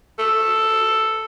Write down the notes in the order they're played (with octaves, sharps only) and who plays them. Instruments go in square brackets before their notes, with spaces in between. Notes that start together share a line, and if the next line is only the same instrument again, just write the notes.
[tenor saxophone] A4